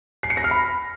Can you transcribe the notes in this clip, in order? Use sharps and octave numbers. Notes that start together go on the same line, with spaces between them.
C7
C#7
A#6
F6
B5